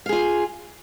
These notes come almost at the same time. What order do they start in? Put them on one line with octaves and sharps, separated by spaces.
F5 G#4 F4